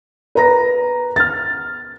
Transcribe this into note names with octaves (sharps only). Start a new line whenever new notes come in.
B4 A#5 A#6
F6 A6